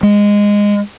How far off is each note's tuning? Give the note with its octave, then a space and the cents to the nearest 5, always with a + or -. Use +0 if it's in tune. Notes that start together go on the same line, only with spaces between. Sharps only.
G#3 -15